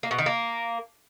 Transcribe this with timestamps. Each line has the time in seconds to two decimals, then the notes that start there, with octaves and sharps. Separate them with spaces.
0.03 A#3
0.11 B2
0.18 D#3
0.26 A#3